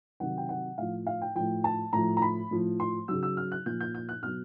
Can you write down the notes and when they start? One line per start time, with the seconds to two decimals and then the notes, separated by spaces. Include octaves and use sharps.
0.20 C3 D#3 F#3 F#5
0.38 G5
0.49 F#5
0.78 A2 F3 F5
1.07 F5
1.22 G5
1.35 A2 F3 G5
1.64 A5
1.93 A2 F3 A#5
2.17 A#5
2.22 B5
2.51 A2 F3
2.80 C6
3.08 C#3 F#3 E6
3.23 E6
3.37 F6
3.52 F#6
3.66 A#2 F3 G6
3.80 G6
3.95 G6
4.09 F#6
4.23 B2 F#3 F6